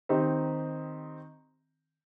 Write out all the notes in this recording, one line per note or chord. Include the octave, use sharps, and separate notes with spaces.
D#3 C4 D#4 G4 D#5